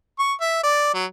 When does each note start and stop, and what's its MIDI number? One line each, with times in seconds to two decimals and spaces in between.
0.19 0.33 85
0.41 0.60 76
0.63 0.92 74
0.94 1.05 54